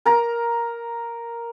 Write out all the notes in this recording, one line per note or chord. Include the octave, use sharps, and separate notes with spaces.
A#4 A#5